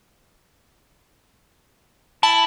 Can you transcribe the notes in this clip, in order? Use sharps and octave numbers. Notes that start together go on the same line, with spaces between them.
E4 A5